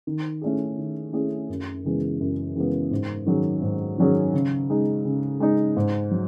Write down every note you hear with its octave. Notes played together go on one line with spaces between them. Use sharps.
D#3
A3 C#4 E4 G#4
D#3
A3 C#4 E4 G#4
F#2
C#3 E3 G#3 B3
F#2
C#3 E3 G#3 B3
G#2
D#3 F#3 C#4 G#4
G#2
D#3 F#3 C#4 G#4
C#3
G#3 D#4
C#3
G#3 D#4
G#2
F#3